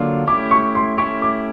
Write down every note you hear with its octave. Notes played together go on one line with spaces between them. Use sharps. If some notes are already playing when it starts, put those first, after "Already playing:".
Already playing: D3 F#3 A#3 D4 F4
A3 C#4 E4 G4 D6
C#6
C6
A3 C#4 E4 G4 C#6
D6